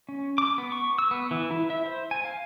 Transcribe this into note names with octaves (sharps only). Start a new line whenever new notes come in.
C#4
D6
B3
C#6
E6
B3
E3
E4
E5
C5
G#5
F5